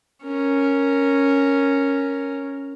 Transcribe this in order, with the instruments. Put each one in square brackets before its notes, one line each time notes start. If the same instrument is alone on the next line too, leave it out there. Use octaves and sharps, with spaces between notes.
[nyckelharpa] C#4 A#4